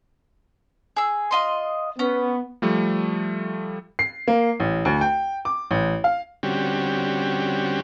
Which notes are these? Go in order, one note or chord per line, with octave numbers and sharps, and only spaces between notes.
G#4 E6
F4 D#5 C6
B3 C#4
F3 G3 A3
C7
A#3
A1
D2
G5
D6
A1
F5
D3 G3 C4 C#4 F#4 G4